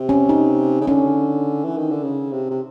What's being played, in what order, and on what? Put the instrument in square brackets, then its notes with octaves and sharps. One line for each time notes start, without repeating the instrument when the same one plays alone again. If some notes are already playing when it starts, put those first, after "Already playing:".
Already playing: [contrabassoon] C3
[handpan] C#4
D#4
[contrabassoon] C#3
[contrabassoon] D3 [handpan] C#4
[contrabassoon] E3
D#3
D3
C#3
C3
C3